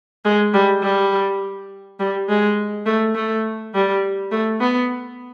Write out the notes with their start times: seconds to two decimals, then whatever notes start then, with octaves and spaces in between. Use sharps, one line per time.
0.25 G#3
0.54 G3
0.82 G3
2.00 G3
2.29 G#3
2.86 A3
3.15 A3
3.74 G3
4.32 A3
4.61 B3